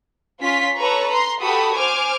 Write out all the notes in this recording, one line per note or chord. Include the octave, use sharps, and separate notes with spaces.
C#4 F4 C6 B6
A4 B4 C#5 A#5 C#6
A#5 C6 C7
F#4 G4 A4 B5 D#6
C5 G#5 D6 F6